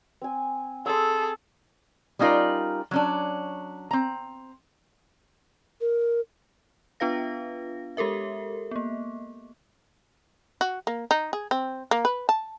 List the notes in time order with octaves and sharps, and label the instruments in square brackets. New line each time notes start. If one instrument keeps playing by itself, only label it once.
[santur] C4 G#5
[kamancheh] G#4 A4 [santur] C6 E6
[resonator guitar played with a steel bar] G3 C#4 D#4 F4 A#4 D5
F#3 C#4 D4
C4 A#5
[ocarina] A#4
[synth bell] B3 D4 F4 B4 F5 A#6
G#3 G4 A4 A#4 E5
A#3 B3
[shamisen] F#4
A#3
D#4
G#4
C4
A#3
B4
A5